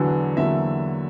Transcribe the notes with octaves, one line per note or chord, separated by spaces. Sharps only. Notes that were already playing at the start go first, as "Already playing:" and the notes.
Already playing: E2 D3 F#3 B3
E2 D3 F#3 A#3 E5